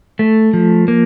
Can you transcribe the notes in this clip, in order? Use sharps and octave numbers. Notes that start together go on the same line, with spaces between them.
A3
F3
A#3